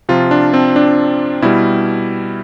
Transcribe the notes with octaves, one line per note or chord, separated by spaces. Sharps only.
C3 F3 F4
D4
C4
D4
B2 G3 E4